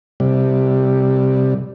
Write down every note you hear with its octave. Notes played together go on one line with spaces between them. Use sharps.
C3 G3